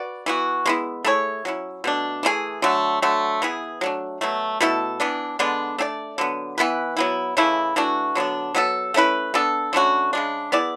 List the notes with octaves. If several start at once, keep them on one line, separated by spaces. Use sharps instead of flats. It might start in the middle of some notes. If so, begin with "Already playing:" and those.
Already playing: F#4 B4 D5
E3 B3 F#4
G#3 B3 E4
A3 E4 G#4 C#5
F#3 C#4 E4
B2 A3 D4
E3 A3 E4 G#4
D3 F#3 A3
D3 F#3 A3
E3 B3 E4 G#4
F#3 A3 D4
B2 F#3 A3
B2 A3 E4 A4
E3 B3 D4
D3 G#3 B3 D4
A3 D4 G#4 D5
D3 F#3 B3
E3 B3 E4 B4
F#3 B3 E4
C#3 E3 A3 E4
E3 A3 D4 F#4
D3 F#3 B3 D4
F#3 B3 E4 A4
A3 C#4 E4 B4
B3 D4 A4
D3 A3 C#4 F#4
C#3 G#3 D4
B3 E4 G#4 D5